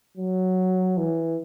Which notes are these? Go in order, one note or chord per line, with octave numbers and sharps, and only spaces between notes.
F#3
E3